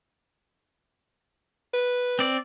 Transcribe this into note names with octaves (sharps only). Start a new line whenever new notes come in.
B4
C4 D5